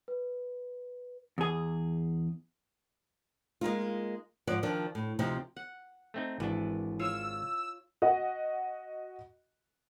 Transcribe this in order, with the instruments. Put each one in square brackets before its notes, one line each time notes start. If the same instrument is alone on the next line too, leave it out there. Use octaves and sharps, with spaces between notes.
[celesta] B4
[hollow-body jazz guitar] E2 G#4
[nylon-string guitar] G#3 A#3 D#4 F4
G#2 F3 C#5 D5 F#5
D#3 F3 D4
A2
D2 C3 F3 C4 D#4
[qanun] F#5
[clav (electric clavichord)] A3 C4 D#4
[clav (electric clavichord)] G#1 D4 [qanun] E3
[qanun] F4 C#5 [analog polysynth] E6
[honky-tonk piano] F#4 D#5 F#5